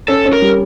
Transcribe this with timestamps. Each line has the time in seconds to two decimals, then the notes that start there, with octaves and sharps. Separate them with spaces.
0.08 C#4 A4
0.26 C#4
0.33 A#4
0.42 G3